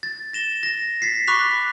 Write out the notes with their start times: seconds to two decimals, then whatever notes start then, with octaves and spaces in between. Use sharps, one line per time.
0.03 A6
0.33 A#6 E7 G7
0.63 A#6
1.02 A6 B6 C7
1.27 B5 C#6 D6 F#6 B6 F7